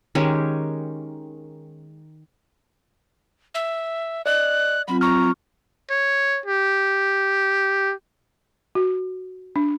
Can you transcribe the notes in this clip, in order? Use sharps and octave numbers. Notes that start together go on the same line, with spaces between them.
D#3 G#3 C#4 G4
E5
D5 D#5 F#6
F#3 C4 F4 B5
A#5 C#6 F6
C#5
G4
F#4
D4